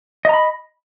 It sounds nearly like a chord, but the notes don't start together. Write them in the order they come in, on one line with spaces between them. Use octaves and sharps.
D#5 A#5 B5